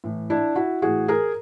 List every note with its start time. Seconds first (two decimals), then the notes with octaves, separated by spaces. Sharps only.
0.04 A2 E3
0.30 D4 E4
0.56 E4 F#4
0.82 A2 E3 F#4 G#4
1.08 G#4 A#4